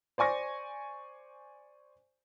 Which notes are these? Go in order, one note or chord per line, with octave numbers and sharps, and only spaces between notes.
C5 D5 G#5 C#6 A#6